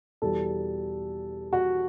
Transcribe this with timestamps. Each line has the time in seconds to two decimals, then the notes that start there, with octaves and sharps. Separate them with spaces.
0.22 E2 B2 G3 A4
1.53 F#4